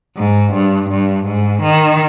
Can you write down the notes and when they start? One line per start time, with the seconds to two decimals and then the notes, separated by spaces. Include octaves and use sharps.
0.17 G#2
0.54 G2
0.90 G2
1.27 G#2
1.63 D#3